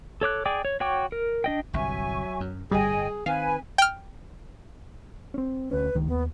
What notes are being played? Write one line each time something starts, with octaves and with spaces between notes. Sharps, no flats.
A4 C#5 D6 F#6
G#4 D5 G5 D6
C#5
F#4 C#5 G5 C#6 D6
A#4
D4 D#5 G5
G1 C2 G2 F#3 E5 G#5 C#6
F#2
G1 A2 G3 G#4 D#5 G5 G#5
D#3 C4 B4 F5 G#5
G5 F6
C4 C#4
D2 C#4 B4
C#2 D#3
D#2 B3